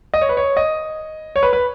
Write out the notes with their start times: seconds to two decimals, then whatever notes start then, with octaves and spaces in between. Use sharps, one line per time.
0.14 D#5
0.21 C#5
0.29 B4
0.37 C#5
0.57 D#5
1.36 C#5
1.43 B4
1.53 B4